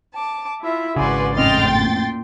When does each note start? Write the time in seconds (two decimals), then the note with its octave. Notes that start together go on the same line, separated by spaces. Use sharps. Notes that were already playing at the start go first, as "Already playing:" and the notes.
0.14 A5 D6
0.61 E4 F4 E5
0.96 G#1 C#3 F#4 B4 D5 G#5 C6
1.36 A1 F2 A2 D#5 G5 C6 F6 A6
1.69 A#2